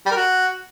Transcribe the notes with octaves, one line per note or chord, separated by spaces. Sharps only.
G3
A#4
F#4